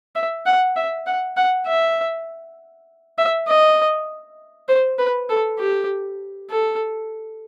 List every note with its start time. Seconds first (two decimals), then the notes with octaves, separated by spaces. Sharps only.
0.15 E5
0.46 F#5
0.76 E5
1.06 F#5
1.37 F#5
1.67 E5
3.18 E5
3.48 D#5
4.68 C5
4.99 B4
5.29 A4
5.59 G4
6.50 A4